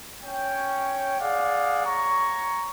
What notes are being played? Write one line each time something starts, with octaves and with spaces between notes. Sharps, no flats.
C#4 C#5 G5
G#4 D5 F5 F#5
C#5 A#5 C#6